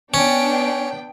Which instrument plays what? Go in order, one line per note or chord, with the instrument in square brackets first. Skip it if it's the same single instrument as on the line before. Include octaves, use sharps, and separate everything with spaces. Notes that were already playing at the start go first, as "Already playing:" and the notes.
[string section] B3 D4 G5 [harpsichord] C#4